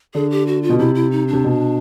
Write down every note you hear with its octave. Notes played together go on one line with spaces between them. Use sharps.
D3 G#4
G4
F#4
F4
B2
C3 E4
E4
D#4
D4
C3
B2